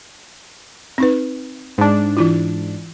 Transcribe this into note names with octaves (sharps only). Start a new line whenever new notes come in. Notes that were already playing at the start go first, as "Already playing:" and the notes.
C4 D#4 B4
G#2 D4
E3 E4 F4